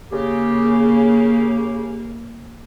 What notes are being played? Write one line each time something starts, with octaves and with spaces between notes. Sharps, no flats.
C#3 A#3 G4